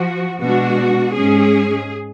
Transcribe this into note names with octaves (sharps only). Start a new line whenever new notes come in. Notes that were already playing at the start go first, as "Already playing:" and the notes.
Already playing: F3 F#4
B2 G#3 D4 F#4
G#2 G#3 C#4 G#4